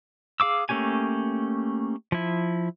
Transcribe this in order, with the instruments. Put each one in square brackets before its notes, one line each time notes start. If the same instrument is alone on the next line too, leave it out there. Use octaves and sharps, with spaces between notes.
[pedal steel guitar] G#4 F5 D6 E6
A3 A#3 C#4 G4 G#5
F3 E4